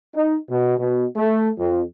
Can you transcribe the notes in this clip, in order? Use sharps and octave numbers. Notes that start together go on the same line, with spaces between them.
D#4
B2
B2
A3
F2